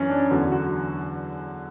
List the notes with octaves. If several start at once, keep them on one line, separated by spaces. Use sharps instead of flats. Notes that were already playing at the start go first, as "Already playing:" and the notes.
Already playing: F#2 E3 C#4
D4
E2 D3 F#3 F#4
F#4